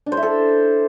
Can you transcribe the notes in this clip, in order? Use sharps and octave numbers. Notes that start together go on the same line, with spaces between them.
D4
C5
E4
A4